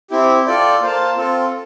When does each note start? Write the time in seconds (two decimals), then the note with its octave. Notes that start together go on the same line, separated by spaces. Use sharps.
0.10 C4 E4 G4
0.47 F4 A4 D5 G5
0.81 A#3 F4 C5 F5 A5
1.17 C4 F4 A4